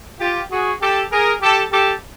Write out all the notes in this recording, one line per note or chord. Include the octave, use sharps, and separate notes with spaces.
F4 G4
F#4 G#4
G4 A4
G#4 A#4
G4 A4
G4 A4